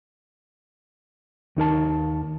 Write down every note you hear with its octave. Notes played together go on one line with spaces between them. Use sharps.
D#2 D#4 A#4 A5